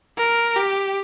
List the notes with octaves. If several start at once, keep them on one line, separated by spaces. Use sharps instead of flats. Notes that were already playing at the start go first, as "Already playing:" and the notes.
A#4
G4